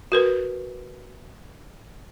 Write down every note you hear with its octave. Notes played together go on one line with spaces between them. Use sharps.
F#4 A#4 B4